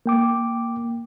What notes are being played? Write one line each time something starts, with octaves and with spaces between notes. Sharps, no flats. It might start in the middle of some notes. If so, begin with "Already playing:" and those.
A#3 G5 D6